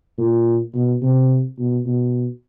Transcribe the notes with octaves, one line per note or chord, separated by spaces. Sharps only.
A#2
B2
C3
B2
B2